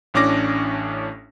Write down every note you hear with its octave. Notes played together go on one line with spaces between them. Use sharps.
A1 A2 C#4 D4 D6 A#6